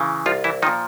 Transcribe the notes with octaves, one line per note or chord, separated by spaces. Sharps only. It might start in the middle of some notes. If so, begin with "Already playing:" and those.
Already playing: C#3 E3
C2 F3 F4
E3 E4
A#2 D#3 F3 D#4